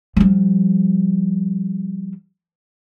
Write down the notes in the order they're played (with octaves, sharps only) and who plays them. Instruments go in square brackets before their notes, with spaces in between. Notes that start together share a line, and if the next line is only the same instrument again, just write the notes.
[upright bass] F3 G3